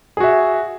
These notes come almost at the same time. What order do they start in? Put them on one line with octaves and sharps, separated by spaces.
G#4 F#4 E5